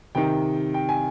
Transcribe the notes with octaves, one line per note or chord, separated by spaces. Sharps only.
C3 D#3 G5
G5
G#5